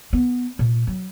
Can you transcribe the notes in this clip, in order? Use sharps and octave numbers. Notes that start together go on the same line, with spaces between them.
B3
A#2
F#3